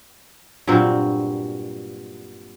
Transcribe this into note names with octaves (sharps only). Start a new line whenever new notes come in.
G2 A#2 F#3 C4